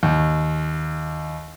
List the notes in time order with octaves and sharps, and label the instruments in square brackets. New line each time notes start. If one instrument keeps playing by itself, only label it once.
[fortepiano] D#2